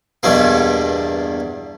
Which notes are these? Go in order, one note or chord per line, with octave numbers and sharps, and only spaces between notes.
E2 G2 B2 A#3